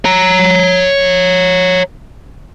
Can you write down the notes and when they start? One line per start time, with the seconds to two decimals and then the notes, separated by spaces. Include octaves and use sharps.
0.05 C#5 A#5